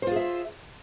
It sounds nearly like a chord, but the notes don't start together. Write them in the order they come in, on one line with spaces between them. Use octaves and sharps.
C5 F4 G#4 E5